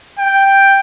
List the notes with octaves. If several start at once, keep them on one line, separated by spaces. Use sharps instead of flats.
G5